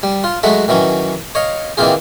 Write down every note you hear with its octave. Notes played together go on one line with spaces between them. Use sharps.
G3
F4
F#3 G#3 A3 F#4 E5
D#3 E3 F#3 C#4
C#5 D#5 F5
D#3 E3 A#3 C4 F4 G#4